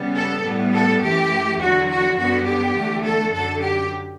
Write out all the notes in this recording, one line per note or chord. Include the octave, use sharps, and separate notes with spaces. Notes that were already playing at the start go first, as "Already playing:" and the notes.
Already playing: C#3 G3 B3
A4
A2 G3 B3
A4
F#2 E3 A3 G4
E2 D3 F#3 F#4
F#4
F#2 D3 G3 B3 F#4
G4
E2 D3 A3
A4
F#2 D3 F#3 A4
G4